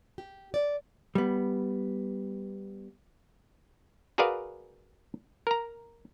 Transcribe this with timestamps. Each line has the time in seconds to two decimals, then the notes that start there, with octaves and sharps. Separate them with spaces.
0.18 G4
0.54 D5
1.15 G3 B3
4.18 F#4 G#4 A#4 B4 D5 F5
5.47 A#4 A#5